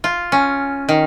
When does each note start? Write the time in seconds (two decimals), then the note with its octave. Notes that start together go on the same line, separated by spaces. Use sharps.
0.04 F4
0.32 C#4
0.89 D#3